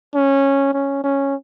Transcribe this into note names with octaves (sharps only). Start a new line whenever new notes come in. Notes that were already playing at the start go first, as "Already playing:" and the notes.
C#4
C#4
C#4